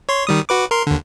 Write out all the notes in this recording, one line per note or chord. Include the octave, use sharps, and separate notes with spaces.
C#5 C6
D#3 G3 D#6
F#4 B4 D6
A#4 C6
D#2 D3